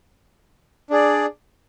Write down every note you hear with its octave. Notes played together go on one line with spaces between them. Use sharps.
D4 G#4 D5